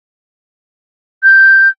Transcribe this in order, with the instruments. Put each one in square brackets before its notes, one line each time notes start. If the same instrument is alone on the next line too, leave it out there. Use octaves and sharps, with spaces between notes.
[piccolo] G6